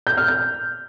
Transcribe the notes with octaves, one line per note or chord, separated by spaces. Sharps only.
G6
F6
G6